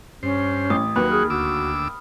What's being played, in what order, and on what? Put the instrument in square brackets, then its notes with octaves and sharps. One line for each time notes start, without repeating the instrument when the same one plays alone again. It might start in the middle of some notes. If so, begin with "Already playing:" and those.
[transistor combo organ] G2 C5 [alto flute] C#4
[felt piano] A1 [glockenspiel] D#6
[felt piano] D#2 [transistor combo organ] F#3 F#4 [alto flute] B4 [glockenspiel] B5
[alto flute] G#4 [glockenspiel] F6
[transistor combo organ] D2 D6 E6 [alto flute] F#4